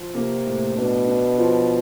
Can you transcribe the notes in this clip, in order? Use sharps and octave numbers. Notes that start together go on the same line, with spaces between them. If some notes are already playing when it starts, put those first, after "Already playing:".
Already playing: F3
C3 A#3
A2
B2 D4
D4
F3